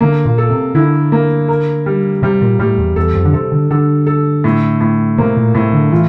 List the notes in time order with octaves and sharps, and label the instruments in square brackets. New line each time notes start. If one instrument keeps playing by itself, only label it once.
[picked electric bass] D3 [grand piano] A#3
[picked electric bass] A#2
[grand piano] A4
[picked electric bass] C3
[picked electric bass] D3 [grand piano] E4
[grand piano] A#3
A#4
G3
[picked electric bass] C3 [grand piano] G3
[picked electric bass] A#2
[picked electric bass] A2 [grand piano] G3
[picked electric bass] E2
[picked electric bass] E2 [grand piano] A4
[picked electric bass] F2
D3
[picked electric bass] C3 [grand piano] A4
[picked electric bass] D3
[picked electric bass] D3 [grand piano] A4
[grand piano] A4
A2
A2
[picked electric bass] C3 [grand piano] A#3
[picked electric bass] A#2
[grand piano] A2 [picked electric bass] C3
[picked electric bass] D3
[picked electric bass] E3 [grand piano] F4